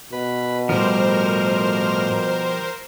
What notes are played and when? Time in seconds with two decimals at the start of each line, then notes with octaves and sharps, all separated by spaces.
0.13 B2 B4
0.69 A2 F3 G3 A#4 C5 F6